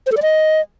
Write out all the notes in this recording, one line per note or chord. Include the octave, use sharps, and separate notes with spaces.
C5
A4
D5
D#5